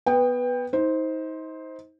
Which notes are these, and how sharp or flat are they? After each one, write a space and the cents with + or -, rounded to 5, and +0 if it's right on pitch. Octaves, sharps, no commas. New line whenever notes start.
B3 +0 B4 +10 G5 +20
D#4 +35 C5 +0